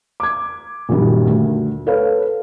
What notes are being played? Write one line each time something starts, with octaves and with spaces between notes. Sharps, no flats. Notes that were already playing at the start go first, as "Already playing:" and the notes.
D6 G#6
A#1 F#2 D#3 G3
D2
A4 B4 C#5 F5